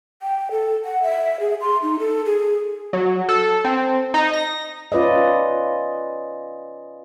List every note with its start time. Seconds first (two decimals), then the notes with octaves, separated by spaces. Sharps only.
0.22 G5
0.51 A4
0.85 F#5
1.03 E5
1.40 G#4
1.61 C6
1.83 D#4
1.99 A4
2.26 G#4
2.93 F#3
3.29 A4
3.65 C4
4.14 D#4
4.33 A#6
4.92 C#4 F4 B4 D5 D#5